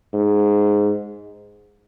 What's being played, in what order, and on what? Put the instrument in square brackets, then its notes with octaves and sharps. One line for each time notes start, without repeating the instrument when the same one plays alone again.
[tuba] G#2